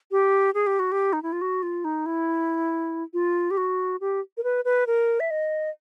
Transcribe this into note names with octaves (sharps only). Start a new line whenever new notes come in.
G4
G#4
G4
F#4
G4
D#4
E4
F4
F#4
F4
D#4
E4
F4
G4
F#4
G4
A#4
B4
B4
A#4
E5
D#5